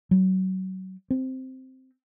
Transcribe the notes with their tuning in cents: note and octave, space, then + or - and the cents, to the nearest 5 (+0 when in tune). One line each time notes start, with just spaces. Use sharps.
F#3 +25
C4 -5